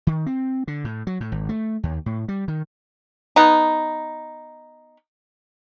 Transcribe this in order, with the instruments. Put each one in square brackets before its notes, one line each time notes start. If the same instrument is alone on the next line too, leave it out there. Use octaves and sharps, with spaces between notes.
[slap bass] D#3
C4
D3
A2
F#3
A2
G#1
A3
D#2
A2
G3
D#3
[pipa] B3 D#4